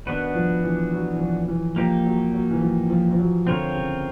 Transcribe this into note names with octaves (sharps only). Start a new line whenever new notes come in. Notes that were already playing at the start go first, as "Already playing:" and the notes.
D#3 B3 D4 F#4 B4
F3
E3
F#3
E3
F3
E3
F3 A#3 D#4 G4
F#3
F#3
E3
F3
F3
F3
F#3
D3 C4 F4 A#4 C#5
C#3